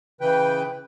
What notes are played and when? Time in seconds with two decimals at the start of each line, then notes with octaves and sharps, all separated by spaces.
0.21 C#3 E3 B4 G5